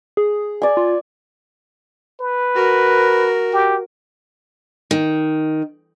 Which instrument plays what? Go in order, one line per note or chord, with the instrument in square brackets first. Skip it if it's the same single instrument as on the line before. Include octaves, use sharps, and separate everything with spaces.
[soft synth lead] G#4
[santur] D5 G#5
[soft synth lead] F4
[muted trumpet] B4
[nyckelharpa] F#4 A#4
[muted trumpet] G4
[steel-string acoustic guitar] D#3